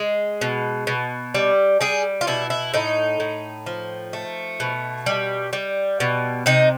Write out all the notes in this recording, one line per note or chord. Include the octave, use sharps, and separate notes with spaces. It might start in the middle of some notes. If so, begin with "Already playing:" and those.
Already playing: G#3
B2
B2
G3
G3 G#4
F4
B2 E4
E4
A2 D#4
A2
F3
A3
B2
G3
G3
B2
C3 D#4